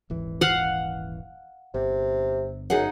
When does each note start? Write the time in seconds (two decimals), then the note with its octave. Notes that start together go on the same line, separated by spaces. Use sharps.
0.10 D#1 G#1 E3
0.41 F5 F#5
1.74 G1 C3
2.70 F#2 D#4 G#4 F#5